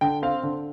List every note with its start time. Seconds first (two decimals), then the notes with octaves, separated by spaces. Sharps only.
0.01 D3 G5
0.23 C4 F5
0.43 D3